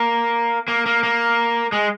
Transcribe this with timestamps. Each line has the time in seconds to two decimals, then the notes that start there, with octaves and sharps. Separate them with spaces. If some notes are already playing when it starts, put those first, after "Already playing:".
Already playing: A#3
0.68 A#3
0.86 A#3
1.03 A#3
1.72 G#3